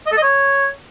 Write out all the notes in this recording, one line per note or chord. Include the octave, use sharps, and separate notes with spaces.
D#5
A4
D#5
C#5